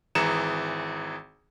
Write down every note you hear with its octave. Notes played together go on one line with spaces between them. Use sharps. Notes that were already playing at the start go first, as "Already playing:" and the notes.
G#1 E3 G#4 A#5 C#7 E7